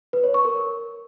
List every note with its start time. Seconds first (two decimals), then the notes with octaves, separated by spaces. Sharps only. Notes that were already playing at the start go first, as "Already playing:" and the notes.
0.13 B4
0.24 C#5
0.34 C#6
0.45 A#4